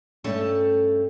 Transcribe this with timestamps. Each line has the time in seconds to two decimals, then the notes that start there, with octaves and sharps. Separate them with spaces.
0.24 G2 A3 C#4 A4 G5 A5